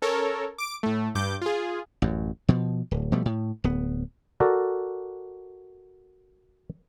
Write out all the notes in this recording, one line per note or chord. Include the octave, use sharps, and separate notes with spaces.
C#4 A4 A#4 C#5
D6 D7
A2 A3
G2 D6 G6
F4 G#4
A1 F#2
B2 F3
D1
B2 F3 G3 A3
A2
D1 B3
F#4 A4 A#4 D5